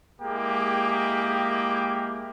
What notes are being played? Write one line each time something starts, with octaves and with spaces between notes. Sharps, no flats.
G#3 A#3 E4 G4 G#4 G5